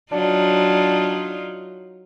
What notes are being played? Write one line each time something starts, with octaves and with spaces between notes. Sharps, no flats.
F#3 D4 D#4 F4